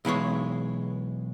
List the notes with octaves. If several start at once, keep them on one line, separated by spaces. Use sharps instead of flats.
B1 E3 G#3 C#5